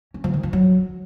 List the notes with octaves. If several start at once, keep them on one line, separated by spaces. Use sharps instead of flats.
C#4
F3
D#3
F3
F#3